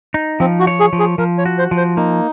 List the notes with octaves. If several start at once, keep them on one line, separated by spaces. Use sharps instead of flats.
D#4
F3 C4
F#4
C#5
G#4
F3
G#4
F3 A#4
C#5
F#4
C5
F3
C5
A#3 D#4